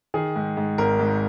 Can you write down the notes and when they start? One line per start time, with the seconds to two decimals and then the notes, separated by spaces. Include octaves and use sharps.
0.14 D#3 G#4
0.36 G#2
0.57 G#2
0.78 G#1 A#4
0.99 G#2